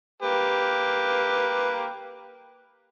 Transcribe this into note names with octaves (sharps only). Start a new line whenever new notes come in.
A#3 G4 B4